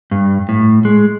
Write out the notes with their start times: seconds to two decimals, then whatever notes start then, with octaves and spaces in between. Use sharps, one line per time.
0.11 G2
0.49 A2
0.85 G#3